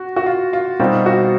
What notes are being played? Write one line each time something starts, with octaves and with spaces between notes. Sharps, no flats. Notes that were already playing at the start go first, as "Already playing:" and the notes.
Already playing: F#4
F#4
F4
F4
B2 G3 C4 D#4 F4
F#4